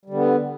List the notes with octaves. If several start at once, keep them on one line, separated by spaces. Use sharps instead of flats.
D3 G3 B3